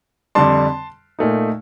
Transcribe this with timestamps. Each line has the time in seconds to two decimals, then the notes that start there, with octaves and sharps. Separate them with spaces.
0.35 F2 D3 G3 D4 A5 C6
1.19 A#2 A3 D#4